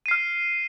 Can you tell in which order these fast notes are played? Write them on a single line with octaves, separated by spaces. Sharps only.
D#7 C7 F6